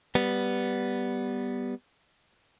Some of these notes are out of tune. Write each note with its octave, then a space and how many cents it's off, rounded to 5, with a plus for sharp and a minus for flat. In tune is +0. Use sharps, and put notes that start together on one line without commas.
G3 +0 B3 +0